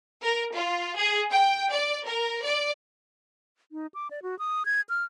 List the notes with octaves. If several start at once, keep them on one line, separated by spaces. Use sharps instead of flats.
A#4
F4
G#4
G5
D5
A#4
D5
D#4
D6
D5
F#4
D#6
G#6
F6